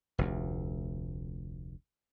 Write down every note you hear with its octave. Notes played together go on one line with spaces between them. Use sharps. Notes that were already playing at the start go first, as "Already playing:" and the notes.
F1 D2